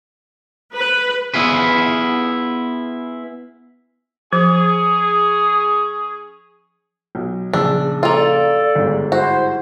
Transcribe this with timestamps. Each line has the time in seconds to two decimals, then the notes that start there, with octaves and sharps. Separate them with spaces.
0.75 B4
1.34 B3 E4 F4 G#4 B4
4.33 F3 C#4 G#4
7.15 B1
7.53 A#1 C#3 D4 E6
8.03 A#3 F4 A4 D5
8.75 G1 G#2
9.12 E4 F#4 C5